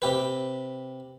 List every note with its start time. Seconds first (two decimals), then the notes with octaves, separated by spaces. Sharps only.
0.02 C3 G4 B4